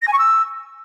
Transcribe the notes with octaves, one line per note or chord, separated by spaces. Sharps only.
A#6
G#5
C#6
E6